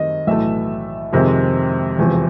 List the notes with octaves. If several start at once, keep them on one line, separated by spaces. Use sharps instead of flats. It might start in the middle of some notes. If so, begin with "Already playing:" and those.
Already playing: F#2 D#3 G3 C4 D#5
B1 A2 E3 A3 E5
F2 C3 D#3 G#3 C4
E1 E2 C3 F3